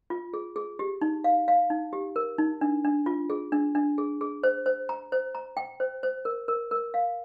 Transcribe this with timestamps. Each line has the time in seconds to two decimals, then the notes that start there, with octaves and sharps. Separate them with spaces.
0.10 F4
0.34 G#4
0.56 G#4
0.79 G4
1.02 D#4
1.24 F5
1.48 F5
1.70 D#4
1.93 G4
2.16 A#4
2.38 D#4
2.61 D4
2.84 D4
3.06 F4
3.30 G#4
3.52 D4
3.75 D4
3.98 G#4
4.21 G#4
4.43 C5
4.66 C5
4.89 A#5
5.12 C5
5.35 A#5
5.57 G5
5.80 C5
6.03 C5
6.25 A#4
6.48 A#4
6.71 A#4
6.94 F5